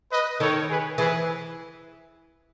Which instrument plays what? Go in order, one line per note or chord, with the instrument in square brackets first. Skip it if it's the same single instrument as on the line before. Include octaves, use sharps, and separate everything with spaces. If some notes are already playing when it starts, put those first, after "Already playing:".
[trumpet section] B4 D#5
[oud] D#3 [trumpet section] A4 C#5
[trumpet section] G#4 B4
[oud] E3 [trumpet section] G#4 B4